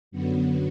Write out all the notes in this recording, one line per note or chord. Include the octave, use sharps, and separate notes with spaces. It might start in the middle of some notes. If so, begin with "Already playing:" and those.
F#2 D3 F#3 B3